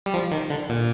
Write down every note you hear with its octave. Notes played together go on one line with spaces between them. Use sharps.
G3
F3
D#3
D3
A#2